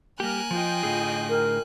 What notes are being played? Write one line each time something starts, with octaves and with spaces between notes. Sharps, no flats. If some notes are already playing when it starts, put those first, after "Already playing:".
G3 A#3 G4 A#4 G#5 F#6
F3 F4 D#5 G5
A2 D3 G#4
A#4